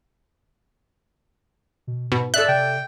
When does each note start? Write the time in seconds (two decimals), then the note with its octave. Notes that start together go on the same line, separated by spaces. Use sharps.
1.87 B2
2.12 G#2 B2
2.34 A4 D5 E5 F#6
2.48 C3 G5